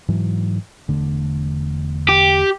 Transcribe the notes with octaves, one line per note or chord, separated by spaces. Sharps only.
G#2 E3 F#3
E1 D3 A3
G4